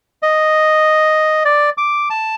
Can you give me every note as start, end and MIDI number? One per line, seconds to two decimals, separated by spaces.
0.23 1.43 75
1.45 1.70 74
1.77 2.09 86
2.10 2.35 81